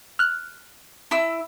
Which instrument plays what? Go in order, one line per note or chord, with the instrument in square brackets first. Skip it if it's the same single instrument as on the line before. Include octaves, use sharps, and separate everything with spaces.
[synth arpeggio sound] F6 F#6
[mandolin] E4 E6